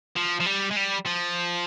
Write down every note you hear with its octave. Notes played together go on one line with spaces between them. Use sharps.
F3
F3
G3
G#3
G3
F3